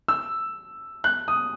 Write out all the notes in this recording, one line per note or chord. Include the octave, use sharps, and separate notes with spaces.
E6
F#6
D#6